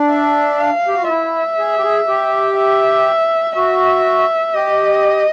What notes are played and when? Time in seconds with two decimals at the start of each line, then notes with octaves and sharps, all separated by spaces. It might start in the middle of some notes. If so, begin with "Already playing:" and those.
Already playing: D4
0.10 E5
0.59 F5
0.88 G4
0.95 F#4
1.02 F4
1.08 E4 E5
1.58 G#4
1.77 G4
1.83 G#4
2.08 G4
2.57 E5
3.56 F#4 E5
4.55 G4 D#5